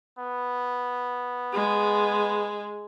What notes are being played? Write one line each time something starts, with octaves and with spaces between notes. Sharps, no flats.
B3
G#3